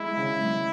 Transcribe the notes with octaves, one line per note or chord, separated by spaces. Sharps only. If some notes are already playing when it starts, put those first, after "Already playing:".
Already playing: G#3 E4
C#3
G#3